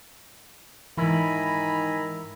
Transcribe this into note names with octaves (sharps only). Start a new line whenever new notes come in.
G#2 D#3 E3 E4 G#5 A#5 B5